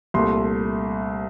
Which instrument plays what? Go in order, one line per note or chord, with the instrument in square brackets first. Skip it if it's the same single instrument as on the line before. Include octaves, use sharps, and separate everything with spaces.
[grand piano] C2 A#2 A3 C6